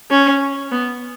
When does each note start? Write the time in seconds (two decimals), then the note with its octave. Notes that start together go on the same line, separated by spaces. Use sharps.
0.11 C#4
0.71 B3